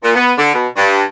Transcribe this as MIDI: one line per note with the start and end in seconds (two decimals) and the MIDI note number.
0.03 0.12 46
0.15 0.32 59
0.38 0.53 50
0.54 0.67 47
0.76 1.02 43